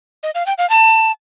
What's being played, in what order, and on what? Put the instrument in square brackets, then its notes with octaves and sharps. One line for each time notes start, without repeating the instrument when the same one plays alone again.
[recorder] D#5
F5
G5
F5
A5